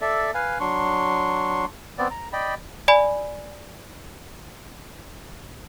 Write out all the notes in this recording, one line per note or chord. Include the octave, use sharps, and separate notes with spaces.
A4 D5 E5
B4 F5 G#5
F#3 D4 C6 C#6
B3 C4 D5
A#5
D5 D#5 G5 B5
D5 G#5 B5